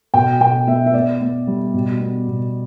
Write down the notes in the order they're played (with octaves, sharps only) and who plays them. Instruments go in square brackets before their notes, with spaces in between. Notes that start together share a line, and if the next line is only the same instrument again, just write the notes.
[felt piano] B2 G5
B2 G5
B3 E5
E5
B3 D5
B3
G3
B2
B3
B2